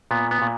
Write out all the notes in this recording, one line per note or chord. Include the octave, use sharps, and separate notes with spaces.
A#2 B3
B3
A#2